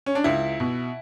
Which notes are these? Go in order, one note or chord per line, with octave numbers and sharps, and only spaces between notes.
C#4
D4
C#2 E4
B2